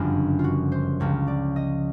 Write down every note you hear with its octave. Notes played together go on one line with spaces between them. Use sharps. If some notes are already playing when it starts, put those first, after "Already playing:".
Already playing: G1 F#2 C#3 F3 F4
F4
F#4
C5
C#2 C#3 F3 C#5
D5
D#5